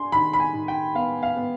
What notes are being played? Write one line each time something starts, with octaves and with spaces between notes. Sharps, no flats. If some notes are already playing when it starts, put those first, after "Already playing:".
Already playing: D4 G#5 C6
D#3 B5
B5
G#5
D#3
G5
B3 F5
F5
B3